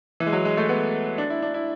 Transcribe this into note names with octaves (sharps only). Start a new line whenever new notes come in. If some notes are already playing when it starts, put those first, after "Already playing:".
E3
G#3
F#3
G#3
A3
B3
D4
E4
D4
E4